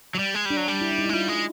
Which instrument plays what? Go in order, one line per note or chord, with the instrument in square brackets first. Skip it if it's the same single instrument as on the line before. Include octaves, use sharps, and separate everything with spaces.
[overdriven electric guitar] F#3
G3
G#3
[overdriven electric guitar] G3 [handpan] D4
[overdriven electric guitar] F#3
G3
[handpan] E4
D4
D#4
E4
[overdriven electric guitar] G#3
[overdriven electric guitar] G3 [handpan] F4
[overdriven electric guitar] G#3